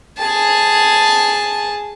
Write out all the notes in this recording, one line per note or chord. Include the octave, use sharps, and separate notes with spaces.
G#4 A5